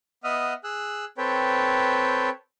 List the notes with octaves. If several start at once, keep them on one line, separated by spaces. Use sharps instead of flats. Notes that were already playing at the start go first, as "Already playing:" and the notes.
B3 D#5 E5 F#5 D#6 F6
G#4 E6 F#6
C4 A4 B4 C#5 G5